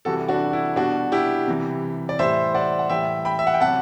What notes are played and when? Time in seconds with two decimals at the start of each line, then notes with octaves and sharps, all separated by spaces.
0.05 C3 E3 G3 F#4 A4
0.29 D4 F#4
0.53 E4
0.76 B2 G3 D4 F#4
1.12 E4 G4
1.47 C3 E3 G3
2.09 D5
2.19 A2 E3 G3 C5 E5
2.55 D5 F#5
2.79 F#5
2.89 A2 E3 G3 E5 G5
3.25 G5 B5
3.39 E5
3.47 F#5
3.54 G5
3.60 C3 F#3 F#5 A5